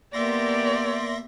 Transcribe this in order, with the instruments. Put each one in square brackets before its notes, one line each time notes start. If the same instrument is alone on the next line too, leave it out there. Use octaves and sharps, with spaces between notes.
[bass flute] A#3 [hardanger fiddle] B3 G4 [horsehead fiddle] D5 [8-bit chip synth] E5 C6 A#6